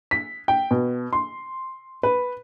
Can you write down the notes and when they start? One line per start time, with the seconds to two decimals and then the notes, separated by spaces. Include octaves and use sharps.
0.11 B6
0.48 G5
0.71 B2
1.13 C6
2.03 B4